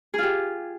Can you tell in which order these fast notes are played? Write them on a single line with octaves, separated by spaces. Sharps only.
G#4 F4 G4